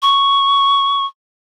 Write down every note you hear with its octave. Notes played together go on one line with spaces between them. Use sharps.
C#6